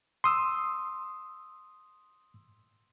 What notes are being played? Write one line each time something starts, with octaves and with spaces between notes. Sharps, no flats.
C6 D#6 E6